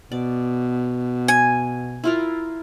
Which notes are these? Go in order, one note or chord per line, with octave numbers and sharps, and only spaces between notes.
B2 D5
G#5
E4 F4 A#4